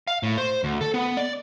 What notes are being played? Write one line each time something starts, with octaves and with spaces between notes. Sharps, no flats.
F5
A2
C5
D2
A4
B3
D5